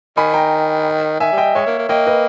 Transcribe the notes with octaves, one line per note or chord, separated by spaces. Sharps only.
D#3 G#5 B5
G5 A#5
D#3 E5 G#5
G3
D#5 G5
G3
G#3 C#5 E5
A#3
A#3
A#3 D#5 G5
B4 D#5